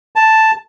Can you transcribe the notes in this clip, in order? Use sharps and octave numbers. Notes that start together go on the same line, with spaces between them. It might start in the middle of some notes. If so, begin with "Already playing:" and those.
A5